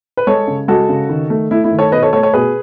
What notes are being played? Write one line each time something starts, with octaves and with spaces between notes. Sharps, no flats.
B4
G#3 A4 C#5
C#3
G#3 F#4 A4
C#3
D#3
A3
A3 E4
E4
D#3
A4 C#5
B2 B4 D#5
A4 C#5
A3 A4 C#5
A4 C#5
B2 G#4 B4